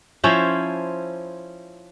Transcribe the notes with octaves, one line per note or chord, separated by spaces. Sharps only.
F3 C#4 E4 C5